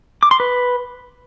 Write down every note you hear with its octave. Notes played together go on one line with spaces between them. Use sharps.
D6
C6
B4